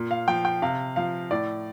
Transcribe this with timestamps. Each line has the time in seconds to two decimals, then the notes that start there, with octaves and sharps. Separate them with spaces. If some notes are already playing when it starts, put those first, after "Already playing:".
Already playing: A#2
0.11 F5
0.28 F3 G5
0.45 G5
0.62 C3 F5
0.96 F3 F5
1.31 A2 D5